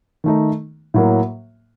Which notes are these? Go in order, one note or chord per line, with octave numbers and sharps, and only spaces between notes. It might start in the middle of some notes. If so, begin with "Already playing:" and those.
D#3 A3 D#4
A2 F#3 A#3